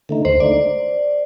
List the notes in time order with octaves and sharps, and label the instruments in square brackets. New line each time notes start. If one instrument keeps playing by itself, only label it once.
[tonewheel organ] D3 A3 D#4
[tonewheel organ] D2 [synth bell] C5
[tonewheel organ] D3 A3 D#4 [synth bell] D5